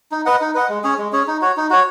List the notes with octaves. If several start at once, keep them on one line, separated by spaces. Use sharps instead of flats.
D#4
B4 D#5 F#5
D#4
B4 D#5 F#5
G#3
C#4 G#4 C#5
G#3
C#4 G#4 C#5
D#4
F#4 C#5
D#4
F#4 C#5